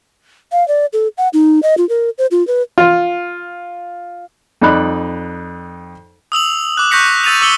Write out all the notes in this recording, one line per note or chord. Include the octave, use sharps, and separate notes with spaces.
F5
D5
A4
F#5
D#4
D#5
F4
A#4
C5
F4
B4
F4
F2 D#4 D5 B5 F#6
D#6 E6 F7 F#7
D6 F#6
C#6 F#6 G6 A#6 B6 C#7
E6 A6 D#7 F7
D6 E6 C#7 F#7 G7